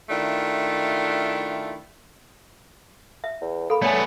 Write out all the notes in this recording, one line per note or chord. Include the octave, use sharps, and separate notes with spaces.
D#3 A3 D4 E4 F4
E5
E2
A#3 A4 B5
A3 B3 C#4 D5 G#5